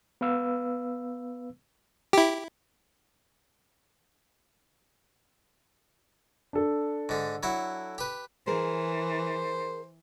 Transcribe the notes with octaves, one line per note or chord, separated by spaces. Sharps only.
B3 B4 F5 E6
E4 G4
D4 A4
G#2 D3
F#3 E4 F#5
G4 B4
E3 G#4 A#4 C5